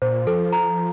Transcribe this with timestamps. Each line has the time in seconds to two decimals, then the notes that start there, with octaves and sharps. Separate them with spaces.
0.02 A#2 C5
0.27 F3 A4
0.52 A#5